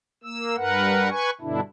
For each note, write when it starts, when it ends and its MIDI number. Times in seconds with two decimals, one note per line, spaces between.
0.23 0.56 58
0.23 0.56 88
0.57 1.09 43
0.57 1.09 70
0.57 1.09 71
0.57 1.09 78
1.10 1.30 71
1.10 1.30 80
1.10 1.30 85
1.41 1.60 43
1.41 1.60 47
1.41 1.60 50
1.41 1.60 62
1.41 1.60 64